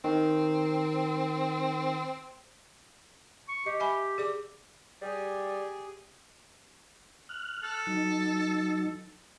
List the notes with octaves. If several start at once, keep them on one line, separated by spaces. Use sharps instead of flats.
D#3 C4
C#6
G4 D#5
E5 G#5 B5
G#4 D5 D6
G3 G4 G#4
F6 F#6
A4
F#3 D#4